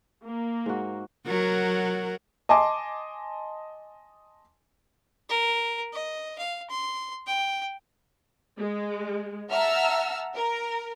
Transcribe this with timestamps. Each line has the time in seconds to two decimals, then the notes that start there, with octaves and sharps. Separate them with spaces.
0.25 A#3
0.66 G#2 F#4
1.26 F#3 F#4 A#4
2.49 D#5 G#5 A5 C6 D6
5.29 A#4
5.93 D#5
6.38 F5
6.70 C6
7.27 G5
8.59 G#3
9.50 E5 F#5 A5 A#5 E6 F6
10.34 A#4